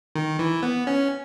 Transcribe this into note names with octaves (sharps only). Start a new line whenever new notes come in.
D#3
E3
B3
C#4